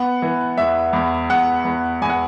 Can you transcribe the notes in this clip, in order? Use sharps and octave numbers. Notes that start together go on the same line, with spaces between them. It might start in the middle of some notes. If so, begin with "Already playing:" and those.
Already playing: B3 F#5
E3
E2 E5
E2
E2 F#5
E2
E2 G#5
F#5